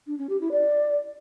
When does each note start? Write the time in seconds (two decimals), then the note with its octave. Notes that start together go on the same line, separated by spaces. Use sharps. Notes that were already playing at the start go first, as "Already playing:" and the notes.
0.07 D4
0.18 C#4
0.29 G4
0.40 E4
0.52 D5